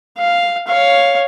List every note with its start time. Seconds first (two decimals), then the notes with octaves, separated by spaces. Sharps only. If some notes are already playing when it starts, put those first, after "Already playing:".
0.18 F5
0.67 C#5 F5